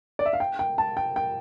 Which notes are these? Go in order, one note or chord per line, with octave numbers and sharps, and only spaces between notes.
D5
E5
F5
G5
G5
A5
G5
G5